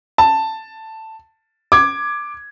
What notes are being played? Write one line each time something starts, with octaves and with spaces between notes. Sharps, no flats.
A5
D6 G#6